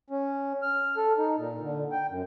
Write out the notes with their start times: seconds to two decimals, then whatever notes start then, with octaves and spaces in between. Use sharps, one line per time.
0.10 C#4
0.62 F6
0.97 A4
1.18 D#4
1.38 A#2
1.61 D3
1.92 G5
2.09 F#2